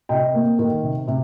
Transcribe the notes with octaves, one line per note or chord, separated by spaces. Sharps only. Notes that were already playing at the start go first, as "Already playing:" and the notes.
C3 D#5 G5
A#3
D#3
C3
C3